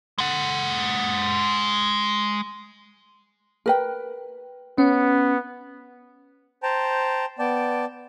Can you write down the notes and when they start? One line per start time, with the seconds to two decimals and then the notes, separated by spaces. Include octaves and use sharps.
0.18 G#3 F#5
3.66 A#4 B4 G5
4.78 B3 C#4
6.63 C5 G5 A5 A#5
7.39 B3 D5 G5 A5